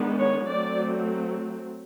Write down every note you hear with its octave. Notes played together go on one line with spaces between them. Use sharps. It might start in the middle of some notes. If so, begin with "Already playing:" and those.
Already playing: D#3 G#3 B3 D4
C#5
F#3 A3 C4 D5